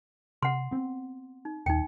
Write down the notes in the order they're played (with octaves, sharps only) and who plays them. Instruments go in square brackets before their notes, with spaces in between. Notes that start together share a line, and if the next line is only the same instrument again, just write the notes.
[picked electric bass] C3 [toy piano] F#5 C6
[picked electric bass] B3 C4
[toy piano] D#4
[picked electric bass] D#1 D#2 [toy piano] D#4 G5